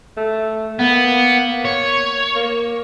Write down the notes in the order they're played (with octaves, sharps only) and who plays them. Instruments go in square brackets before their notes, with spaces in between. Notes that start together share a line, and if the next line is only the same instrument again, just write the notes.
[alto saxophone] A3
[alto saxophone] A#3 [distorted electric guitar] B3
[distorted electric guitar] C#5
[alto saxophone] A#3